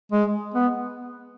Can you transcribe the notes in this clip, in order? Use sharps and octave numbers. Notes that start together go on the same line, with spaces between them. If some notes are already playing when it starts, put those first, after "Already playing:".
G#3
B3